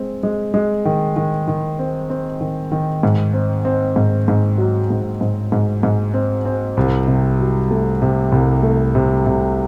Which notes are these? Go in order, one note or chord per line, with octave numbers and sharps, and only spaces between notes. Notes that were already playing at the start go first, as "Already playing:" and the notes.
Already playing: G#3 C4
G#3
G#3
D#3
D#3
D#3
C4
C4
D#3
D#3
G#2
C4
C4
G#2
G#2
F#3
G#2
G#2
G#2
G#2
C4
C4
C2
C3
F#3
A3
C3
C2
A3
C3
C3